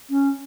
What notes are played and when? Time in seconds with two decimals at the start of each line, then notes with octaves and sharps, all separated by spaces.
0.10 C#4